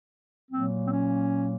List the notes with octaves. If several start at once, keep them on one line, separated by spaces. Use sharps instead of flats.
A#2 F#3 A#3 C4
C4
C#4